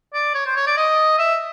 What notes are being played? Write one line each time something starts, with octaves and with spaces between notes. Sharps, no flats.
D5
C#5
C5
C#5
D5
D#5
E5